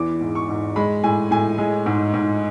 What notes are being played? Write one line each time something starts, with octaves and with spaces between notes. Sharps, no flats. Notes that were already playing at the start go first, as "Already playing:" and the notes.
Already playing: E2 E3 D6
G#2
C#6
G#2
G#3 B5
A2 G#5
A2 G#5
G#3
G#2
G#2